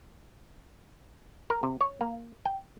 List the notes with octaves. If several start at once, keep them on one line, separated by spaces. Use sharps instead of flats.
A#4
C3
C#5
A#3
G5